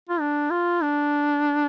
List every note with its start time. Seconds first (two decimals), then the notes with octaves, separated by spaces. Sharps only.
0.09 F4
0.20 D4
0.51 F4
0.83 D4